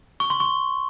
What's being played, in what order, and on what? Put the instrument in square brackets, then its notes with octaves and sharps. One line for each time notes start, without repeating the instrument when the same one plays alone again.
[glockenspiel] C#6
C6
C#6